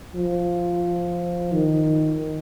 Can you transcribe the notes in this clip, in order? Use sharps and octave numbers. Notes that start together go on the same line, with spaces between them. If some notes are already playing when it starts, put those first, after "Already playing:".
F3
D#3